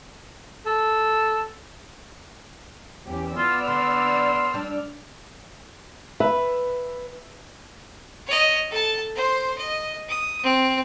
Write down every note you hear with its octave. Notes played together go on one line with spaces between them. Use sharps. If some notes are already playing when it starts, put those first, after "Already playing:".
A4
E2 C#4 G4
B3 F4 D5 E6 F6
D3 C6
G3 D4
B4 E5
C#5 D#5
A4 A5
C5 C6
D#5
D#6
C4